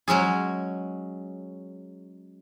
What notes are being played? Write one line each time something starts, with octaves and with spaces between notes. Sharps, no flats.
F#3 G#3 C#4 G#4